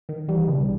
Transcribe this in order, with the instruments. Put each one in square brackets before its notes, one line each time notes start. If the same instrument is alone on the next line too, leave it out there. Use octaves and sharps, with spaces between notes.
[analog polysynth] D#3
[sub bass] E3 [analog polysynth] G3
[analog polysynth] B1 [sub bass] C#3